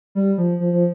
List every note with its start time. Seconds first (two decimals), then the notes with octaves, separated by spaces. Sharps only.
0.15 G3
0.38 F3
0.60 F3
0.73 F3